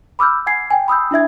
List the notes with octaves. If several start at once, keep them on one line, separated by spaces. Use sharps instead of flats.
B5 D6 E6 F6 G6
F#5 G#5 G#6 C7
G5 G#5
B5 D#6 E6 G6
D4 E4 E5 G#6